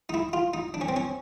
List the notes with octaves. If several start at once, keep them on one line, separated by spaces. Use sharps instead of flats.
D#4
E4
F4
D#4
D4
C#4
C4
C#4